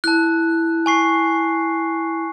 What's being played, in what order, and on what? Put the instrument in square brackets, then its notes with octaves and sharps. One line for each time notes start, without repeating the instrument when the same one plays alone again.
[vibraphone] E4 [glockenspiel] A5 F#6
[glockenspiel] G#5 C#6 C7